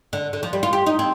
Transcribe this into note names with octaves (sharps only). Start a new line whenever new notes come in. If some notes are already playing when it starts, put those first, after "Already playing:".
D3
D3
F3
G3
F4
G4
D#4
C4